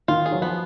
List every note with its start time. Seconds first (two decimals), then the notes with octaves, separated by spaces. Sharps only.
0.08 D#3 F4
0.26 G#4
0.32 F#3
0.42 F3 B3